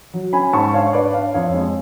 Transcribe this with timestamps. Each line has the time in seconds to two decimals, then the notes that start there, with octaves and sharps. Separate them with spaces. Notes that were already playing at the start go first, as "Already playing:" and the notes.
0.14 F#3
0.33 C#4 G#5 B5
0.53 G#2 A5 C#6
0.74 D4 C#5 F5
0.93 D4 B4 D5
1.13 D4 C#5 F5
1.34 F2 C#5 F5
1.54 G#3 C#5